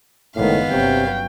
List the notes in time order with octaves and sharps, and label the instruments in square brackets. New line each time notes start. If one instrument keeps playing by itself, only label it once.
[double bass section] F#1 D#3 G#3 [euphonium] A2 [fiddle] B3 F5
[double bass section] G1 F#3 C#4 [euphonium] C3 [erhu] G5